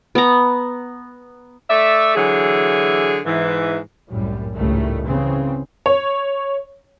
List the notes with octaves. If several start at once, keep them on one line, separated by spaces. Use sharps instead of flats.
B3 A#5
A3 D5 E5
D3 E3 F#3 G#4
G#2 E3
C2 F#2 A2 G3
G#1 C#2 A2 D#3 G3 A3
C#3 E3 C4
C#5